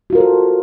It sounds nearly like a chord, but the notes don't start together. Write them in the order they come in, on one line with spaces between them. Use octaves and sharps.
F#4 F4 A#4 C5 A4